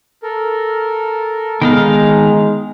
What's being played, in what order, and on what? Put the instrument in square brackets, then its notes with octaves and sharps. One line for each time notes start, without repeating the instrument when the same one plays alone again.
[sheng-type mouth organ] A4 A#4
[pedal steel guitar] D#3 D#4 F5 [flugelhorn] G#3 [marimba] B3